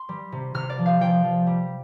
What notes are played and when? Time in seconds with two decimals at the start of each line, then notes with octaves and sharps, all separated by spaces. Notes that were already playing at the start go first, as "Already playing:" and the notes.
Already playing: C6
0.09 G3
0.32 C3
0.54 C3 F6
0.70 D5
0.78 F3
0.86 F5
1.00 F3 G5
1.24 F3
1.47 G3